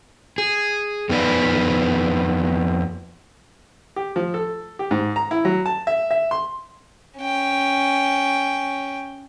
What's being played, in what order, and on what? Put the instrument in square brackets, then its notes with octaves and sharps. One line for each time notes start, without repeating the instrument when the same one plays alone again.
[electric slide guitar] G#4
F2 B3 D#4 B4 D5 F#5
[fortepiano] G4
F3
A4
G4
G#2
A#5
E4
F#3
A5
E5
E5
C6
[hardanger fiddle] C#4 G5